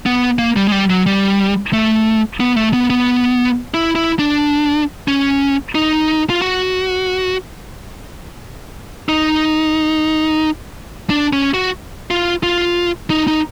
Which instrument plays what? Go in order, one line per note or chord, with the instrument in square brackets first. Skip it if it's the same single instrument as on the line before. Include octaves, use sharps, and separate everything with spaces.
[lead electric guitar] B3
A#3
G3
G#3
G3
F#3
G3
A3
B3
A3
B3
B3
E4
E4
D4
C#4
D#4
F4
F#4
D#4
D4
C#4
F#4
F4
F4
D#4
D#4